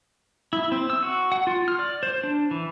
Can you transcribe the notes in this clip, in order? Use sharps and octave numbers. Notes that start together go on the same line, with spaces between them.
E4
C4
E6
F#4
F#5
F4
F6
D5
C5
D4
E3